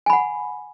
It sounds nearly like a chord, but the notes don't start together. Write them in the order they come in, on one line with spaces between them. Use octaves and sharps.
G#5 B5 F#5